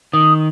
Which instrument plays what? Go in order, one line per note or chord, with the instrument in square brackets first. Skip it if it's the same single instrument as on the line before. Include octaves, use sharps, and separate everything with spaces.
[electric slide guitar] D#3 [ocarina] D#6